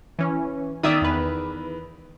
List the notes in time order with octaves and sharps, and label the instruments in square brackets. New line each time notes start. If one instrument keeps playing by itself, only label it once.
[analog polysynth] E3 C#4
[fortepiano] D#3 [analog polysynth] D5 E5 D#6
[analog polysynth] E2 B4